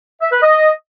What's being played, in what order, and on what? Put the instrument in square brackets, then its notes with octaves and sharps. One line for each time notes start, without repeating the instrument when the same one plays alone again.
[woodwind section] E5
B4
D#5